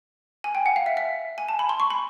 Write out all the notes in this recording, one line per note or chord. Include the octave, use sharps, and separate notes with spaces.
G#5
G5
F#5
F5
E5
E5
G#5
A5
B5
C6
C#6
B5